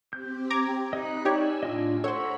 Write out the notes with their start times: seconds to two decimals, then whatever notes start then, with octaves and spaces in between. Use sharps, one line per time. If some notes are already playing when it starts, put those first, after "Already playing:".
0.13 C4 G4 G6
0.50 A#5 D6 G#6
0.93 D#4 D#5 B5 F#6
1.25 D#4 G4 C#5 D5 G#5 E6
1.63 A2 D4 F4 D#5
2.04 A4 C5 C#5 F#5 A#5 B5 C#6